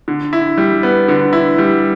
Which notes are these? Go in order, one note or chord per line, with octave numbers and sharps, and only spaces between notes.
D3
E4
G3
B3
D3
E4
G3